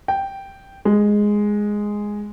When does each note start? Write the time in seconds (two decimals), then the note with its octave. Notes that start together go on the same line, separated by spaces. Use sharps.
0.08 G5
0.85 G#3